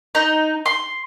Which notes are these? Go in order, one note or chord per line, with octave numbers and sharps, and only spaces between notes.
D#4
C6